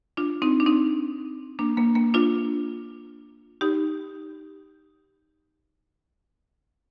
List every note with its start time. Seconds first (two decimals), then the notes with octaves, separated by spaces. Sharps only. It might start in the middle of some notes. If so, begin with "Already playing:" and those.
0.17 D4 F4
0.42 C4 D#4
0.60 D4
0.66 C4 D#4
1.59 A#3 D4
1.77 A#3
1.95 A#3
2.14 D4 F4
3.61 D#4 G4